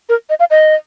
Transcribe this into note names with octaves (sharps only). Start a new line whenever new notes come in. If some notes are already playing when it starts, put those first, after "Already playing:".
A#4
D#5
F5
D#5